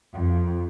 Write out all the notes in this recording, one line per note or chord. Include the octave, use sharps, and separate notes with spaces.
F2